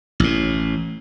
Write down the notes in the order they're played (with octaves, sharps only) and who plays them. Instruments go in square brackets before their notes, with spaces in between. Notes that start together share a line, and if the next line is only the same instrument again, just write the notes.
[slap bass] A1 A2